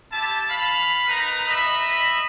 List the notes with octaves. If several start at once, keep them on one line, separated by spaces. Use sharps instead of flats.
E4 G4 A5
F5 B5
D#4 A#4 B4 A#5
D#5 E5 B5